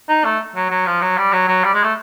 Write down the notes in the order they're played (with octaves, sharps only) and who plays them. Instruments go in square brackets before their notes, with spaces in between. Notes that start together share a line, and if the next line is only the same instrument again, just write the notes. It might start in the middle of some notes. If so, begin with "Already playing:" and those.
[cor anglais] D#4
A3
F#3
F#3
F3
F#3
G3
F#3
F#3
G3
G#3
A3